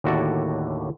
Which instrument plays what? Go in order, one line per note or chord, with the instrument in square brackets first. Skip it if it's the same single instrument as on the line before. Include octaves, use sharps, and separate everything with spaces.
[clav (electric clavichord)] D#2 A2 D3 F#4 A4 D5